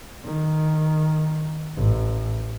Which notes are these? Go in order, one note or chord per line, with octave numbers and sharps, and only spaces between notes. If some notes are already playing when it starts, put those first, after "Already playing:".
D#3
A1